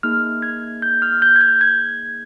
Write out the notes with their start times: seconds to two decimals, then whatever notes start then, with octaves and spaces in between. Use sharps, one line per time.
0.03 A#3 D#4 G#4 F6
0.42 G#6
0.82 G6
1.02 F6
1.22 G6
1.36 G#6
1.41 G6
1.61 G#6